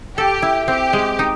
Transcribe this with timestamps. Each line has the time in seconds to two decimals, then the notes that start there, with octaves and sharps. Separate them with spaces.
0.17 G4 A4
0.42 E4
0.68 C4 G4
0.93 G#3
1.19 D#4